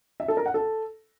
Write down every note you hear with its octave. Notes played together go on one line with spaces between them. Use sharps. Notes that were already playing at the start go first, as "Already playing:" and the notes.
E5
A4
A#4
F#5
A4